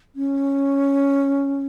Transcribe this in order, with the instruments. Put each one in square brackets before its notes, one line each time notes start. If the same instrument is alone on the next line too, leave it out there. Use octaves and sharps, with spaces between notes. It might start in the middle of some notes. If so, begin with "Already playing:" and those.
[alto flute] C#4